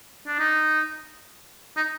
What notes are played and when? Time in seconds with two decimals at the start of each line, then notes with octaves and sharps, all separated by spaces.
0.27 D4
0.39 D#4
1.77 D#4